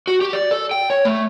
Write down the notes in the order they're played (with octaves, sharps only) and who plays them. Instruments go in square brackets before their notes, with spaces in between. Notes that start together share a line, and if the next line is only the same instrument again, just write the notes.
[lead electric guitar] F#4
G4
D5
A4
G5
C#5
A3